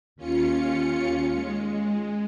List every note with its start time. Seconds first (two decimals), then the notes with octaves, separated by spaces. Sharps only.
0.16 D#2 C#4 F4 C#7
1.31 G#3